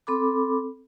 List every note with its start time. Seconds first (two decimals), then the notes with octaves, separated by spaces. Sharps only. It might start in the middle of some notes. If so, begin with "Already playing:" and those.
0.07 C4 A4 B5 D6